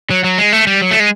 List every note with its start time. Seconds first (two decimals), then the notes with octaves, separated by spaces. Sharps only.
0.10 F#3
0.24 F#3
0.38 G#3
0.52 A3
0.67 G3
0.81 F#3
0.91 A3
1.00 G#3